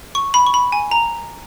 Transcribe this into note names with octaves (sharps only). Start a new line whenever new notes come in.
C#6
B5
C#6
B5
G#5
A#5